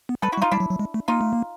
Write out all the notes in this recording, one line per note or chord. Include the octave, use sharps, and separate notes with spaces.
B3
G3 A4 B4
E4 F#4
G3
D#4 F4
G3 D4 E4
F#3
F#3
G#3
A3
A#3 D#4 F4
A3
A#3